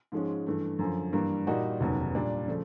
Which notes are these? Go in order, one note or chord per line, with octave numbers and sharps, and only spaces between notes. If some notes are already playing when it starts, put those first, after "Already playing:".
G#2 F3 G#3 C#4
G2 E3 A3
F#2 D3 F3
G2 E3 G3 A#3
A#2 G3 A#3 D#4 F#4
F1 D#2 C#3 F#3 B3
A#2 G3 A#3 D4
C#3 F3 A3